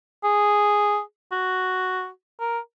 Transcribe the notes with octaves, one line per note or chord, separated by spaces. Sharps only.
G#4
F#4
A#4